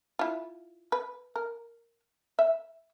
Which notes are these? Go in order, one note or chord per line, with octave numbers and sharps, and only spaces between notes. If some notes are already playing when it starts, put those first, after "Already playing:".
E4 F4
B4
A#4
E5